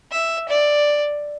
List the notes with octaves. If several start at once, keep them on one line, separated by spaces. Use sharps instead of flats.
E5
D5